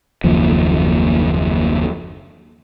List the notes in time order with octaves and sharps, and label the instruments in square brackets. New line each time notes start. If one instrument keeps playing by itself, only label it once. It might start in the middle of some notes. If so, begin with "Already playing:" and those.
[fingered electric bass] F#1 D#2 F3